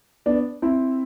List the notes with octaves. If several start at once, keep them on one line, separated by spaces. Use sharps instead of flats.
B3 D4
C4 E4